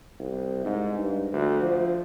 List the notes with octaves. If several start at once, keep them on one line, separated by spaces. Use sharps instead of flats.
C2
G#2
G2
D2
F3